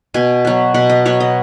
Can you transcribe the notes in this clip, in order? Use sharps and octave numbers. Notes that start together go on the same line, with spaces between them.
B2 G#5
F#3 B3
B2 F#5
D#5
F#3 B3 C#5
D#5